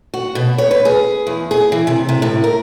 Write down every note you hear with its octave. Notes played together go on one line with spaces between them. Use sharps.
F#4
B2
C#5
B4
G#4
E2
G#4
E3
C3
C3
A2
A#4